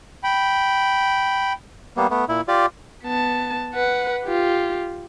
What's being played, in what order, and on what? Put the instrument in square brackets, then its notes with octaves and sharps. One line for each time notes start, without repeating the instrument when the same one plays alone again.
[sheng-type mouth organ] G5 B5
[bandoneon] G3 A#3 B3
A3 B3
A#2 E4
F4 G4 D5
[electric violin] B3 A5
B4 F#5
F4 G4